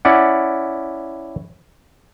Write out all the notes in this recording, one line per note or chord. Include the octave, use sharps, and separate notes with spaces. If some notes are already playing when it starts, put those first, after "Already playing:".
C#4 E4 D5 F#5